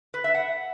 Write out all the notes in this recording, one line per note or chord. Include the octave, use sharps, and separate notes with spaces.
B4
E5
F#5